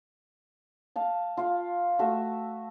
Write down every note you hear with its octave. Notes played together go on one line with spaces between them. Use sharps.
F5 A5
F4 F5
A3 F#4 E5